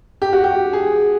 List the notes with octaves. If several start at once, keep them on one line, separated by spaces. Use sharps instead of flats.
G4
F#4
G4
G#4